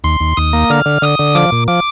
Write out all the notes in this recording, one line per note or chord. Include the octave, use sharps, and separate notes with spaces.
D#2 C6
D#2
D#2 D#6
A#3
D3 F6
D3
D3 D#6
D3
F3 D6
A#2
F3 D6